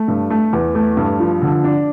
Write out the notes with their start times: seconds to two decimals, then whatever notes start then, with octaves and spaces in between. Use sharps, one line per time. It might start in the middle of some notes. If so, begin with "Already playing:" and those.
Already playing: A3
0.08 G2
0.30 A3
0.53 E2
0.75 A3
0.97 G2
1.20 F3
1.42 D3
1.64 D4